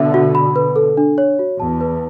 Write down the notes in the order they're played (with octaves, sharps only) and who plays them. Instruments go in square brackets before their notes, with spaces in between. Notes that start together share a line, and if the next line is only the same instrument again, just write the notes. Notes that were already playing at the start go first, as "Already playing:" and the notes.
Already playing: [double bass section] B2 D3 [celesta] E5
[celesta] F#4
B5
B4
A4
D4
C#5
F#4
[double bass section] E2 [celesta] A5
[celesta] B4